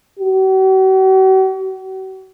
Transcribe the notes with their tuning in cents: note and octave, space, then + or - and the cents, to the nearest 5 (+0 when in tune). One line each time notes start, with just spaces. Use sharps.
F#4 +45